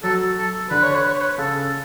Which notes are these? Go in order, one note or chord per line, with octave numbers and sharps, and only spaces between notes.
F#3 A4
A4
D3 B4
C#5
B4
C#5
B4
C#3 A4